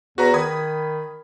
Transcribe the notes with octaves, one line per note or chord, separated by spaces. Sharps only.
E2 F#4 B4 A#5
D#3 B5 D#6 G#6